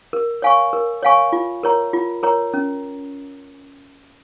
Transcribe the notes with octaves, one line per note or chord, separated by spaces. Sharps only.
A#4
C#5 F5 G#5 C#6
A#4
C#5 F5 G#5 C#6
F4
A#4 C#5 A#5
F4
A#4 C#5 A#5
C#4